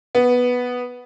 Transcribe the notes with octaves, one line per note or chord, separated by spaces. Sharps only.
B3